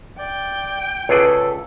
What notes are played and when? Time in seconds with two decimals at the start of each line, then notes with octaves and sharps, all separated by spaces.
0.19 D5 G5
1.09 C#2 G#4 A4 B4 C#5 D5